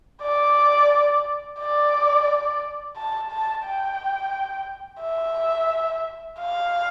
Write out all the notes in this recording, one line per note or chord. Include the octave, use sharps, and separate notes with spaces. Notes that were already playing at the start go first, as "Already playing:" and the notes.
D5
D5
A5
A5
G5
E5
F5